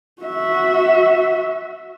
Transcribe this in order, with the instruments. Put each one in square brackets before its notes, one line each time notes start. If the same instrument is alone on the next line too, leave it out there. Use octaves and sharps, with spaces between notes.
[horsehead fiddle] F#4 E5